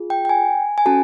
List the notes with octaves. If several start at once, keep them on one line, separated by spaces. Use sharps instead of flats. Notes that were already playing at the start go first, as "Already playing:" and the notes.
Already playing: F4 G#4
G5
G5
G#5
G#5
C#4 F#4 A4 A5